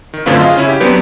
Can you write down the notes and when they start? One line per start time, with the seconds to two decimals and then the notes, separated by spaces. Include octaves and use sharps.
0.14 D#3
0.26 F#2 A2 D3 C4 F4 B4
0.39 F4 G#4 D#5 F5
0.56 C#3 C#4 E4
0.69 G4
0.80 F#3 B3 C4 D4 G4 B4